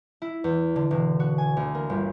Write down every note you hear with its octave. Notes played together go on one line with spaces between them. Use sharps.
E4
E2
D3
E1
F#4
G#5
D2
A#3
G1